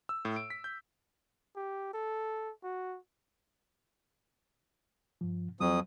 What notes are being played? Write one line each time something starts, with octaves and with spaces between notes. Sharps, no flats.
E6
A2
D7
B6
G6
G4
A4
F#4
G2 F3
F2 F#3 D#6